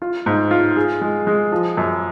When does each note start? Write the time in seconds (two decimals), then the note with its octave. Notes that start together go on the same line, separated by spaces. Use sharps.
0.02 F4
0.26 G#2
0.51 F4
0.76 G#4
1.02 G#3
1.27 G#3
1.52 F3
1.77 F#2